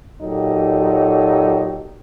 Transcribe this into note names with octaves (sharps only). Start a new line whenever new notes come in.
A#2 F#3 D#4 G4 A4